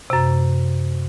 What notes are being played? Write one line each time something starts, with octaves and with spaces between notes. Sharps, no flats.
F#2 C3